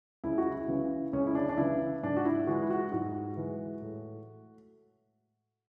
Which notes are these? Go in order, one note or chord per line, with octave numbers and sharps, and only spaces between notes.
C#2 E4
F#4
E4
C#3 E3
C#2 C#4
E4
D4
D4
C#3 E3 E4
G#2 D4
F#4
E4
E3 G#3 F#4
E4
F#4
G#2 F#4
E3 G#3
A2